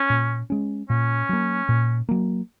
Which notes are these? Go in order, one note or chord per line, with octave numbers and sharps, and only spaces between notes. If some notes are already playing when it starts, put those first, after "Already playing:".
Already playing: C#4
A#2
G#3 C#4
A#2 C#4
F#3 A#3
A#2
F#3 A#3